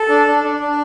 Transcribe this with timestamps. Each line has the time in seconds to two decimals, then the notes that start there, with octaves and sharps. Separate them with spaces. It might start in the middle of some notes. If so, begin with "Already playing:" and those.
Already playing: A4
0.09 D4
0.27 D4
0.43 D4
0.60 D4